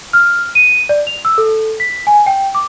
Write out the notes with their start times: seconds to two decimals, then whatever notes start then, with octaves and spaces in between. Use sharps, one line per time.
0.13 F6
0.55 D#7
0.89 D5
1.07 F7
1.25 E6
1.38 A4
1.80 B6
2.07 G#5
2.27 G5
2.55 D6